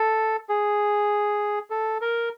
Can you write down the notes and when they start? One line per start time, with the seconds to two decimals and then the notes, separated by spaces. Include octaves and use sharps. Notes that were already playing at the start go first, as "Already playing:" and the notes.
Already playing: A4
0.49 G#4
1.70 A4
2.01 A#4